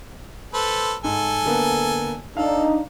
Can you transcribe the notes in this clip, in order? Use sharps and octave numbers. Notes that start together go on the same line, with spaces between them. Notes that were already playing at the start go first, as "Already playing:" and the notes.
A4 B4 C5
G#2 A4 G#5
D3 A#3 B3
D4 D#4 A4 F5